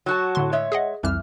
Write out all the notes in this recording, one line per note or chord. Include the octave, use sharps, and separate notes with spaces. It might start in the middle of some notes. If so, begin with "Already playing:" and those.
F#3 F#4 A5
A2 D3 C6
G#3 C#5 E5
G#4 D#5 F#5
C2 F2 E3 F6